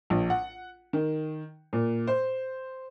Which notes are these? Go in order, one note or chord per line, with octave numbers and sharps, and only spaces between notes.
A#1
F#5
D#3
A#2
C5